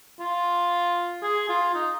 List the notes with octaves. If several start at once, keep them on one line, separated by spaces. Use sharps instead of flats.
F4
G#4
F4
D#4